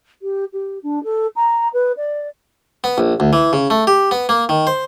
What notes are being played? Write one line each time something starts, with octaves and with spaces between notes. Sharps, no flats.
G4
G4
D4
A4
A#5
B4
D5
B3
A#1
D2
E3
C#3
A3
G4
B3
A#3
D#3
C5